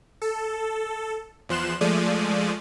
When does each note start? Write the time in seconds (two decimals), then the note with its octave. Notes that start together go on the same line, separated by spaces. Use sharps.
0.22 A4
1.49 E2 F3 C6 F#6 E7
1.81 F3 G#3 A3 D5 D#7